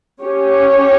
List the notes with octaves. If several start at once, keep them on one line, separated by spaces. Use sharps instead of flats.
C#4 G4 C#5